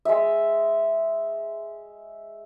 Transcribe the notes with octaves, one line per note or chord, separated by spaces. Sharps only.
G#3 E5